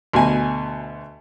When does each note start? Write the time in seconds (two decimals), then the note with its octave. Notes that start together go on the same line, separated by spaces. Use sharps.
0.14 D2 B2 G#5